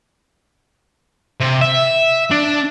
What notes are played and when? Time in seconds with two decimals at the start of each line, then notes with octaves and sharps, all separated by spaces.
1.40 C3
1.61 E5
2.31 D4